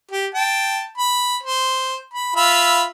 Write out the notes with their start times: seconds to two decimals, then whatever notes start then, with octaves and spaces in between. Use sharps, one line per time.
0.11 G4
0.34 G5 A5
0.98 B5
1.43 C5
2.13 B5
2.36 F4 E5 B5